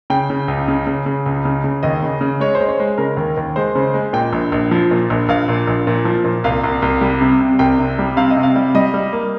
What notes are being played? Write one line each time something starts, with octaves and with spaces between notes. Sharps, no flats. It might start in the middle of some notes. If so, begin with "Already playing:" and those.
C#3 G5
C#3
C#2
C#3
C#3
C#3
C#2
C#3
C#3
D#2 D#5
C#3
C#3
G#3 C#5
C5
G#3
C#5
G#3
C#3 A#4
D#2
D#2
G#3 C5
C#3
G#3
A#2 G5
A#1
A#1
F3
A#2
A#1
A#1 F5
A#2
A#1
A#2
F3
A#2
C2 F5
C2
C2
G3
C3
C3
C2 G5
C3
G3
C3 F5
D#5
C3
F5
G3
G3 D#5
G3
A#3